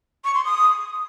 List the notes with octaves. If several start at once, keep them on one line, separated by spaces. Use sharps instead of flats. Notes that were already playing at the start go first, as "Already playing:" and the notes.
C#6
C6
D#6